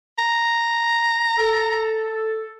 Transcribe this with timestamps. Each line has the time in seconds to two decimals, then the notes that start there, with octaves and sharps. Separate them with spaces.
0.19 A#5
1.38 A4